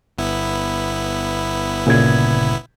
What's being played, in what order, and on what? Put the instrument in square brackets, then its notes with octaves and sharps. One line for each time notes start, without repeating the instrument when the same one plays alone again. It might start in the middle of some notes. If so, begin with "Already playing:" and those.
[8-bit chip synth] G1 B3 E4
[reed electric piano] A#2 C#3 G#6